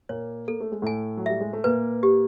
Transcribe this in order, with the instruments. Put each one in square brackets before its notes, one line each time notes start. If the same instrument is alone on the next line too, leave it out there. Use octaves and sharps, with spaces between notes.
[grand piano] A#2 A#3 [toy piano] C#5
[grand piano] A#3 [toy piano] A4
[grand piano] A3
G#3
[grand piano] A2 A3 [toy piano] G#5
[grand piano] F#3
[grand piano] G3 [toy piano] E5
[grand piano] G#3
A3
[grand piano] A#2 A#3 [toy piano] B4
[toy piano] G4